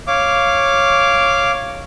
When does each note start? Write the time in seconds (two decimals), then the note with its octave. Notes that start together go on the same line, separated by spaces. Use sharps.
0.07 C#5 F5 D6